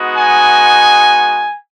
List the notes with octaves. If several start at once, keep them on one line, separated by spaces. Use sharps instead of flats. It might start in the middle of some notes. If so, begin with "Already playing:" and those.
Already playing: G#3 B3 D#4 F#4
G#5